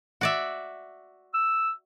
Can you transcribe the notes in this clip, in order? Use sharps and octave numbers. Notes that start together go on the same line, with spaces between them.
F#4 D5 E5
E6